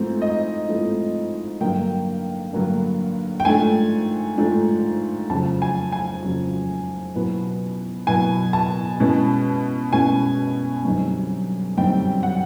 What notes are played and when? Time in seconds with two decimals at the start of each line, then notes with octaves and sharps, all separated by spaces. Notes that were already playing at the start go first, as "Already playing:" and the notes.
Already playing: G#2 F3 A3 C4 E4
0.22 D#5
0.69 G#2 F3 A3 C4 E4
1.60 G2 D3 F#3 A#3 D4 G5
2.53 G2 D3 F#3 A#3 D4
3.40 G5
3.45 G#2 F3 A3 D4 G#5
4.38 G#2 F3 A3 D4
5.30 F2 C#3 F#3 A5
5.62 G#5
5.92 G#5
6.22 F2 C#3 F#3
7.15 B2 F#3 B3 E4
8.07 B2 F#3 B3 E4 G#5
8.53 A5
9.00 B2 G#3 C#4 E4
9.92 B2 G#3 C#4 E4 G#5
10.85 F#2 D3 G3 C4 D#4
11.77 F#2 D3 G3 C4 D#4 G5
12.23 F#5